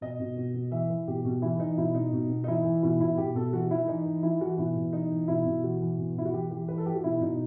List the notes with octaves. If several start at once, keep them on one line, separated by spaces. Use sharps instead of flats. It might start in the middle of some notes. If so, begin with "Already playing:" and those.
B2 D#5
B2
B2
B2
E3 E5
E3
B2 G4
B2
E3 E4
E3 D#4
B2 E4
B2 D#4
B2
B2
D#4
E3 E4
E3
B2 E4
B2 E4
B2 G4
B2 A4
E3 F#4
E3 E4
E3 D#4
E3
E3 E4
E3 F#4
B2 E4
B2
E3 D#4
E3
B2 E4
B2
E3 F#4
E3
B2
B2 E4
F#4
E3 G4
E3 G4
E3 B4
A4
E3 G4
F#4
B2 E4
B2 D#4